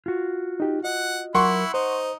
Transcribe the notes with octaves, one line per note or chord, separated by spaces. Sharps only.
F4 F#4
D#4 G4
D#5 F#5
F#3 E4 A#4 F#5 C6 C#6
D#4 C5